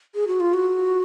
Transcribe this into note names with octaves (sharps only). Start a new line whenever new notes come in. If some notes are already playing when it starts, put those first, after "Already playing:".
G#4
F#4
F4
F#4